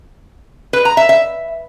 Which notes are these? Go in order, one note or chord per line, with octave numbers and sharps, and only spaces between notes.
B4
A#5
E5
E5